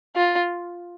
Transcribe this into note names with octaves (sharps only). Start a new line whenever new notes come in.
F4